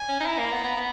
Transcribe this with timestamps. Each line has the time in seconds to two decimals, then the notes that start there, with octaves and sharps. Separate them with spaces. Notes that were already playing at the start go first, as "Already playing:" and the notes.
Already playing: G#5
0.09 C#4
0.20 D#4
0.26 E4 A#5
0.39 A#3
0.52 B3
0.64 B3
0.77 B3